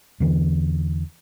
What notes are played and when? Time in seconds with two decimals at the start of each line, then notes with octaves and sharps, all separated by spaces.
0.20 E2 D3 E3